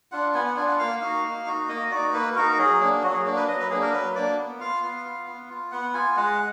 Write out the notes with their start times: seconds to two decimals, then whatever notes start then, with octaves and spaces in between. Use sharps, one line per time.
0.12 D4 F4 F#5
0.34 B3 G#5
0.45 F#5
0.56 D4 F4 G#5
0.68 F#5
0.79 A#3 F5
1.01 D#4 F#4 F5
1.24 A#3
1.46 D#4 F#4
1.69 A#3 D#5
1.91 D#4 F#4 D5
2.13 A#3 B4
2.35 D#4 F#4 A#4
2.53 A#4
2.58 F#3 G#4
2.80 A#3 D4
3.03 F#3 F#4
3.14 G#4
3.25 A#3 D4
3.37 B4
3.48 F#3 D#5
3.60 B4
3.70 A#3 D4 G#4
3.82 A#4
3.92 F#3 B4
4.15 A#3 D4 D5
4.38 B3
4.60 F4 F5
4.82 B3
5.04 F4
5.27 B3
5.50 F4
5.72 B3 F#5
5.94 F4 G#5
6.17 G#3 F#5